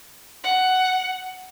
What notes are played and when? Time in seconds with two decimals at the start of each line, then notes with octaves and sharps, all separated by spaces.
0.44 F#5